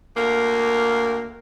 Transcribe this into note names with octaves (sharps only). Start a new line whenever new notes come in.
D2 A#3